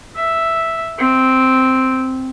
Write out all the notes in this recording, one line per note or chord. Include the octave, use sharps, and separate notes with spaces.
E5
C4